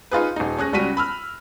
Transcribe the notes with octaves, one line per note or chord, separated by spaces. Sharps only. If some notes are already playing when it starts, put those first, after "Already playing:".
D#4 F4 G#4 B4
D#1 D#4
C#4 G#4 F#6 A#6
C#2 G3 C#4 F#4 B6 D#7
B5 E6 F6